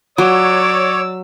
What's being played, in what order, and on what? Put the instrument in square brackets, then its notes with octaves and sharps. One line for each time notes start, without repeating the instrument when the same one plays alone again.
[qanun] F#3 [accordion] C#5 [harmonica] D5 E6 [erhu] D6